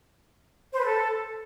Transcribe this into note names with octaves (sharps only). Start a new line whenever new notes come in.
C5
B4
A4